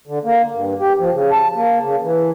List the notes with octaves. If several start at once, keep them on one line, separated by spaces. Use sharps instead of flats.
D3
A#3
G2
G4
F3
C#3
A5
A#3
C#3
E3